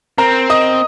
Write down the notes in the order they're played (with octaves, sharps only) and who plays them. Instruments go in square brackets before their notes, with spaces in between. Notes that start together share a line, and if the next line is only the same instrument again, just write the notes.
[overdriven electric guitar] C4 [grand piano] A#4 A#5
[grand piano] D#5 D#6